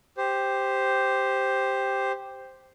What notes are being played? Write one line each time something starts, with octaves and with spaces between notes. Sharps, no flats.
G4 C5